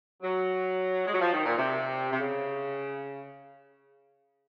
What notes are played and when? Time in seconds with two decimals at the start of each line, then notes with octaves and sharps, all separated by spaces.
0.23 F#3
1.07 G#3
1.14 F#3
1.21 F3
1.33 D#3
1.45 A#2
1.58 C3
2.12 C3
2.20 C#3